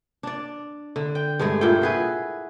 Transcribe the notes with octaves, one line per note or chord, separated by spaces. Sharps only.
D4 D5
D3
G5
G2 G#3 A3 G#4
A#2 E4 A4 G5
F#4 G#4 B4